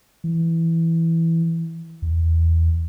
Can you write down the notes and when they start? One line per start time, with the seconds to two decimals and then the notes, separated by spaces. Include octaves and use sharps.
0.24 E3
2.02 E2